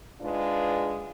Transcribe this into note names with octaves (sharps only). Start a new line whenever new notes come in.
G#2 G#3 D4 F4 B4